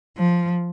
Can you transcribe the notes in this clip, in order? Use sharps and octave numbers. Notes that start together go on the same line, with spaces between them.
F3